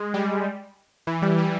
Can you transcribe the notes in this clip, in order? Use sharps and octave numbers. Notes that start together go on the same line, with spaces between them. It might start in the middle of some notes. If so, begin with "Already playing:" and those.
Already playing: G#3
G3
E3
G3
G3